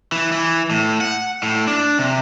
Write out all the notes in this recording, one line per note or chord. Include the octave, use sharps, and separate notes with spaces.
E3
E3
A2
F#5
A2
D4
C3